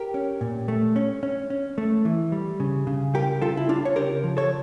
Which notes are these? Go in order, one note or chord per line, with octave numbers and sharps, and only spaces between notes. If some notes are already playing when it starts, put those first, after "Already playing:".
Already playing: G4 A#4
C#4
A#2
A3
C#4
C#4
C#4
A3
E3
G3
C#3
C#3
G3 G4 A#4
C#3 F4 A4
E4
C#4 D4 F4
C#5
C#3 G4 A#4
F3
A4 C#5